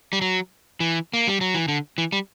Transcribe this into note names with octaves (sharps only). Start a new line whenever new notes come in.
G3
F#3
E3
A#3
G3
F#3
E3
D3
E3
G3